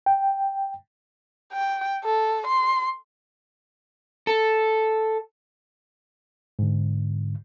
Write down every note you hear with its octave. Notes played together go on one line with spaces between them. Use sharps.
G5
G5
A4
C6
A4
G#2 D3